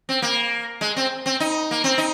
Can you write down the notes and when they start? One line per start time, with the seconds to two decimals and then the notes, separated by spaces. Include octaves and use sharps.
0.09 C4
0.22 A#3
0.81 G#3
0.96 C4
1.26 C4
1.40 D#4
1.71 A#3
1.84 C4
1.98 D#4